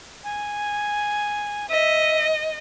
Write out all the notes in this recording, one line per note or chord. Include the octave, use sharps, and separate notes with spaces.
G#5
D#5 E5